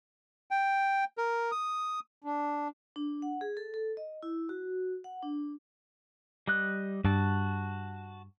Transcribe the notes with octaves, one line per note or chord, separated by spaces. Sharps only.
G5
A#4
D#6
D4
D4
F#5
G#4
A4
A4
D#5
E4
F#4
F#5
D4
G3 D#5 F#6
G2 F#4 A5